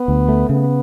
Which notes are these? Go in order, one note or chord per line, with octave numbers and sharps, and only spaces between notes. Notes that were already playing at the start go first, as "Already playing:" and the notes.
Already playing: B3
D2
A3
C#3 B3